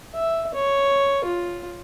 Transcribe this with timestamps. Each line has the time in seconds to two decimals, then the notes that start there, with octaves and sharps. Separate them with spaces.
0.14 E5
0.54 C#5
1.24 F4